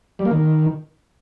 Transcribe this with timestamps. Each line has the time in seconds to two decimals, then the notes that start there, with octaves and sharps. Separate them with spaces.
0.19 G3
0.25 A#3
0.31 D#3